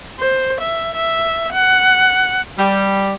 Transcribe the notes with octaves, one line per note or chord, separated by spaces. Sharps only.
C5
E5
E5
F#5
G3